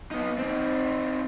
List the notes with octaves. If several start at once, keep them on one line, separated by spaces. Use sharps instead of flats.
B3 D#4
C4 D#4